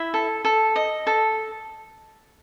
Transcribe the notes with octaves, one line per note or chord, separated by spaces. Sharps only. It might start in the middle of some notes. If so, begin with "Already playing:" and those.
Already playing: E4 E5
A4
A4
D#5
A4